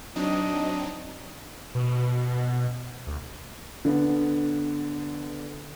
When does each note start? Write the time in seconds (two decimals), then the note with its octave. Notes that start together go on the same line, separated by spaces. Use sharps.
0.16 F#3 C4 D4 D#4 D#5
1.75 B2
3.07 D2
3.85 D3 B3